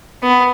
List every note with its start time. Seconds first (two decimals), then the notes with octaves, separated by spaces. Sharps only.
0.22 B3